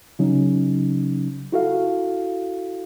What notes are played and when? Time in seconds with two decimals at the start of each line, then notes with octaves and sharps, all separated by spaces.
0.19 C#3 F#3 C#4 D#4
1.52 E4 F#4 A4 F5